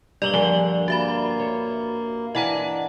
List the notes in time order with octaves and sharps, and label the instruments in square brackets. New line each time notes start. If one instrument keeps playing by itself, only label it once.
[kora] G2 A#3 [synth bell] D5 F#7 G7
[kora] D3 [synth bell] F3
[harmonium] A#3 [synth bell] F#4 E5 B5
[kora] C#5
[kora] E3 D4 A#4 [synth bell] D#5 F#5 A#5